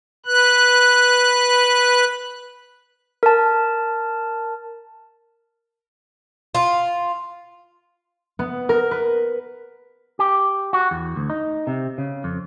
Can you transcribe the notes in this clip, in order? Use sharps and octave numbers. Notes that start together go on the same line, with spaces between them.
B4 F#6
A#4 A5
F4
B3
A#4
B4
G4
F#4
E2
D2
D#4
C3
C#3
F2